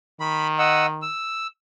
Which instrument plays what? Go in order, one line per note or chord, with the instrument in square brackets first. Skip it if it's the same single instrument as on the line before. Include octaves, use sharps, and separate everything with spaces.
[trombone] D#3 [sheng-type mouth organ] B5
[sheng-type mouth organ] D#5 F#5 E6
E6